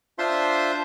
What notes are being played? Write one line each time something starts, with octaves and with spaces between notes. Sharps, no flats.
D4 F4 C5 E5 C6